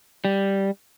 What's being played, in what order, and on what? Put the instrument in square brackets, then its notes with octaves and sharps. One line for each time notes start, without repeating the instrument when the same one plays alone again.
[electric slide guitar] G3